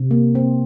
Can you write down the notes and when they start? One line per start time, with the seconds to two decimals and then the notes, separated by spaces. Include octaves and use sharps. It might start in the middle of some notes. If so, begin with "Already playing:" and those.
Already playing: C3
0.11 A#3
0.35 C4